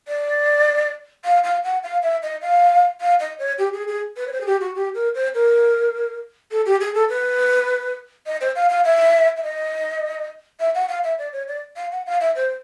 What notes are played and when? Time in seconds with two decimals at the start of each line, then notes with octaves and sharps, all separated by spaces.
0.08 D5
1.25 F5
1.44 F5
1.64 F#5
1.83 F5
2.03 E5
2.23 D#5
2.42 F5
3.01 F5
3.20 D#5
3.39 C#5
3.58 G4
3.73 G#4
3.88 G#4
4.17 B4
4.27 C#5
4.32 C5
4.41 G#4
4.46 G4
4.61 F#4
4.75 G4
4.95 A#4
5.15 C5
5.34 A#4
6.51 A4
6.66 G4
6.81 G#4
6.95 A4
7.09 B4
8.26 D#5
8.41 C5
8.56 F5
8.70 F5
8.85 E5
9.37 E5
9.43 D#5
10.60 E5
10.75 F#5
10.89 F5
11.04 E5
11.19 D5
11.33 C#5
11.48 D5
11.77 F5
11.92 F#5
12.06 F5
12.21 E5
12.36 C5